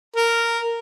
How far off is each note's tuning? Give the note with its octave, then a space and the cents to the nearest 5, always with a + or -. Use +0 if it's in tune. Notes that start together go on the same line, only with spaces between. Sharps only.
A#4 -10